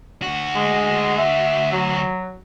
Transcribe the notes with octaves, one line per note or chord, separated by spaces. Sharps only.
D2 F#4
G#3
E5
F#3